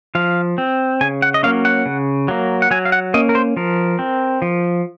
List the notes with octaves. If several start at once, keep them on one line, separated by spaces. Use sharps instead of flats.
F3 F5
C4
C#3 G#5
F#5
D#5
F#3 A#3 C#4 F5
F#5
C#3
F#3 A#3
F#5
F#3 G#5
F5
F#5
A#3 C#4 D#5
A#4
C5
F3 A#4
C4
F3